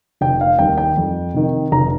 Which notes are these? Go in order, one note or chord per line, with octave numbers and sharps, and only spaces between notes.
F1 G5
F5
D#2 D#3 G3 G5
G5
F2
C3 D#3
F1 A#5